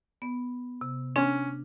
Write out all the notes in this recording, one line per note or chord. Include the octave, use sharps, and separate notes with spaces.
B3
C3
C#4 D4